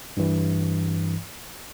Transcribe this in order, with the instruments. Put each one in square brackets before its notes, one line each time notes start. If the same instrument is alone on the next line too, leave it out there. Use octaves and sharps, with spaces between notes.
[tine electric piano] G2 E3